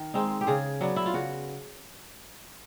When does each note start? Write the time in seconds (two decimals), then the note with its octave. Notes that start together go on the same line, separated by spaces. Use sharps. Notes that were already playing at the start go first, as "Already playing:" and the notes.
Already playing: D#3
0.14 G#3 C4 D#4
0.41 G4
0.47 C#3 G#4
0.81 F#3 B3 D4
0.96 E4
1.06 F4
1.14 C#3 F#4